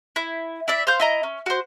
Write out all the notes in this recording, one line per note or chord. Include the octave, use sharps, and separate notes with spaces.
E4
E4 D5 E5
C5 F5 G6
E4 D#5 A#5
C#4
F#4 C5